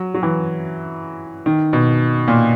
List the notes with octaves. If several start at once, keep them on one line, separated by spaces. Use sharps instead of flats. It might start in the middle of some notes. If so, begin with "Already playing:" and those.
Already playing: F#3
F#3
E3
D#3
B2
A#2